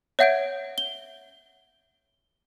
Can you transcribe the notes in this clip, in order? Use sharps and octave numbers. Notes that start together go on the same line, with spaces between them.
C#5 E5 F#5 G6 G#6 D7
G7